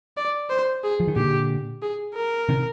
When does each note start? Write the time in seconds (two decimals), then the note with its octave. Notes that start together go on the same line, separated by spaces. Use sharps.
0.17 D5
0.50 C5
0.84 G#4
1.00 F3
1.08 D#3
1.16 A#2 D3 G4
1.82 G#4
2.15 A#4
2.49 C3 D#3